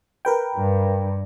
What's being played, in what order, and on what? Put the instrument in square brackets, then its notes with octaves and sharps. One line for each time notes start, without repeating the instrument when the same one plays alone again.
[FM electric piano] A#4 B4 G5
[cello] G2